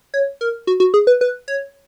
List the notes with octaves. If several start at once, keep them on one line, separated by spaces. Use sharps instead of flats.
C#5
A#4
F#4
F#4
G#4
B4
B4
C#5